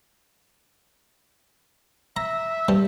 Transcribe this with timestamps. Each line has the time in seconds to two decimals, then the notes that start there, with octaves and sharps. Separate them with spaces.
2.17 E5 A#5
2.68 G2 G3